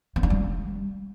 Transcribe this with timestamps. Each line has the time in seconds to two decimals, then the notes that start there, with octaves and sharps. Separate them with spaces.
0.16 B3
0.23 D4
0.30 G3